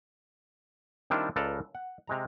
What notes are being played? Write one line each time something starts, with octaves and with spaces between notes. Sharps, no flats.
D#3 G3 C4 D4 E4 F4
C#2 F4 A4 B4 D5 A#5
F#5
C3 G#3 A#5